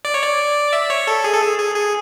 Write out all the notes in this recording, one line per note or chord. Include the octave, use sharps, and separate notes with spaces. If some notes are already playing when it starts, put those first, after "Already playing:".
D5
C#5
D5
E5
C#5
A4
G#4
A4
G#4
G#4
G#4